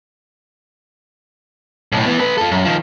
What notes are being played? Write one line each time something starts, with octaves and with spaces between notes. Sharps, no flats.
B1 A2
E3 B3
A3 B4
F4 A4
F#2
D#3 F3